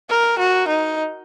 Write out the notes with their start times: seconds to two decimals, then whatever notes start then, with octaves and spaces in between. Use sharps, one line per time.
0.10 A#4
0.39 F#4
0.68 D#4